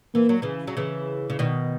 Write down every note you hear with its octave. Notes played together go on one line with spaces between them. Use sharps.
E3 A#3
F#3
C#3 E3
F#3
C#3 E3
C#3
B2 D#3